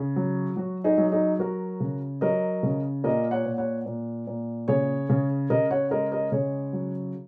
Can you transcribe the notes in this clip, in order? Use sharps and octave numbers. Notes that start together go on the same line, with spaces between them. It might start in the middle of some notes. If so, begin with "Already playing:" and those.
Already playing: C#3
F#3
F#3 F#4
D#4 G#4
F#3
D#4 G#4
F#3 F#4 A#4
C#3
F#3 A#4 D#5
C#3
A#2 A#4 D#5
C#5 F#5
A#2
C#5 F#5
A#2
A#2
C#3 G#4 C#5
C#3
C#3 A#4 D#5
C#5 F#5
G#3 A#4 D#5
A#4 D#5
C#3 G#4 C#5
F#3